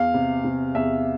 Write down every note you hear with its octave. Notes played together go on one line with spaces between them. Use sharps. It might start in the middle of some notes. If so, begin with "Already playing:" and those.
Already playing: E2 F5
C3
C3
E2 E5